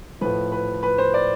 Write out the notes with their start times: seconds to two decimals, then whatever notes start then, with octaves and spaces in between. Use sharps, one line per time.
0.21 A2 F3 B4
0.52 B4
0.83 B4
0.98 C5
1.14 D5